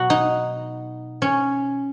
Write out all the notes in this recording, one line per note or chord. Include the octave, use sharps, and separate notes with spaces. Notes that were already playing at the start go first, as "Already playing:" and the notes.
Already playing: B2 F#3 F#4
D#4
C#4